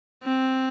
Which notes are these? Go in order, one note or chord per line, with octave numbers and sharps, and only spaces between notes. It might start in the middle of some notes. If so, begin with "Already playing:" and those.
C4